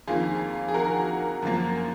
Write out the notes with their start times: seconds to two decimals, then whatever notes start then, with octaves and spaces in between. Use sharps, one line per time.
0.07 F2 D#3 A#3 F4 G#4
0.68 G#4
0.74 F#4 A#4
1.42 F#2 F3 A#3